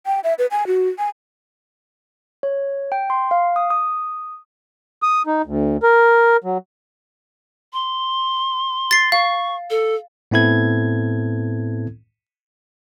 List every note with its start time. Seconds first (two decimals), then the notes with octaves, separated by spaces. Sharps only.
0.06 G5
0.24 E5
0.39 B4
0.51 G#5
0.67 F#4
0.98 G#5
2.43 C#5
2.92 G5
3.10 C6
3.31 F5
3.56 D#6
3.70 D#6
5.03 D#6
5.27 D#4
5.45 D2
5.83 A#4
6.44 F#3
7.73 C6
8.91 A6 C7
9.12 F5 C#6
9.70 A4
10.31 A2 B3 C4 E4 A4 G#6